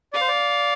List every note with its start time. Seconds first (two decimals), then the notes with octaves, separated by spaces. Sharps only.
0.13 D5 F5
0.21 C5
0.28 D5